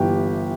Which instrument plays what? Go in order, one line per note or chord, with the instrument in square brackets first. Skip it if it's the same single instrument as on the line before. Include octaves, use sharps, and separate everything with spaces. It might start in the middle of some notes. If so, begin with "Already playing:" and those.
Already playing: [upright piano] G1 E3 G4